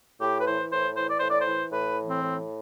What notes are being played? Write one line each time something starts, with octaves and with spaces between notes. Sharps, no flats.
A2 G4
B4
E3 C5
A2 C5
E3 C5
D5
A2 C5
D5
C5
E3
A2 B4
E3
C4
A2